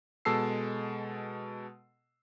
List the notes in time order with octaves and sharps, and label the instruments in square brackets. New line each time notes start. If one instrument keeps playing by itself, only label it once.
[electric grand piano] B2 G#3 A4 A5 E6 C7